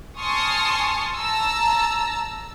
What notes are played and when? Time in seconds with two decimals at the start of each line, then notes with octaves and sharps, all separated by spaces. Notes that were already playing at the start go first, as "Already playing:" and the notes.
0.19 G#5 A5 C6 C#6 D#6 F6
1.17 A5 A#5 E6